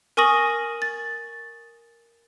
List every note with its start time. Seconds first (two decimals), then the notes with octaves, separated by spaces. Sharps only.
0.17 A#4 G#5 C#6 D#6 A#6 F#7
0.82 A6